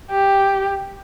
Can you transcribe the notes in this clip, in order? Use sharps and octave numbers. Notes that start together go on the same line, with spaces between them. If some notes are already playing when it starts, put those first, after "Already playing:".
G4